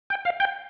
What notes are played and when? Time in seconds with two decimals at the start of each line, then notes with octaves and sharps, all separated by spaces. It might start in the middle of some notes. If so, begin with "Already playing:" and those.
0.10 G5
0.25 F5
0.40 G5